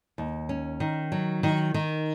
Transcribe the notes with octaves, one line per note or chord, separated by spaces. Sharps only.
D#2
C#4
D#3
F#3
D#3
D#3